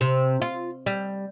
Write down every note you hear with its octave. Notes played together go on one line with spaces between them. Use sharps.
C3
F4
G3